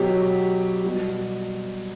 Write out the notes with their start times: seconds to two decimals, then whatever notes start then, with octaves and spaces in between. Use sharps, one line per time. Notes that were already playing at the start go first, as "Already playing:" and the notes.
Already playing: B2 F#3 G4
0.84 B2 G3